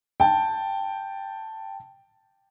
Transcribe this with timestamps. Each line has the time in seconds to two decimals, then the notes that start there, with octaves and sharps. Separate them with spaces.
0.20 G5 A5